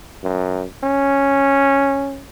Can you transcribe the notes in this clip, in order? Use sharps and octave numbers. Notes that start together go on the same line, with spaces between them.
F#2
C#4